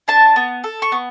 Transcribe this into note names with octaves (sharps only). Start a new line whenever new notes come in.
D4 A5
B3
A4
C#6
B3